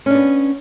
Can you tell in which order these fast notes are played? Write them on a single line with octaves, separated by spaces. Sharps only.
C#4 D4 B3